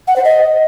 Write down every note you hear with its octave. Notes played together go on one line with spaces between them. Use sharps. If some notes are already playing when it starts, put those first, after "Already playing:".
F#5
C5
D#5